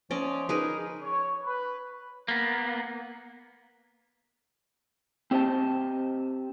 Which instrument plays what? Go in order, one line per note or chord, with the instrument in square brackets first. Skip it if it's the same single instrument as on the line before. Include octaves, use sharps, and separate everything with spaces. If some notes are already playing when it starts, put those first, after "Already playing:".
[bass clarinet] F3 [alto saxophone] C#4 [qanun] D5 D#5
[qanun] D#4 A#4 B4 [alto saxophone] G#4
[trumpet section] C#5
B4
[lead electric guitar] A#3 B3
[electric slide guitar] C4 G4 C5 D#5 A5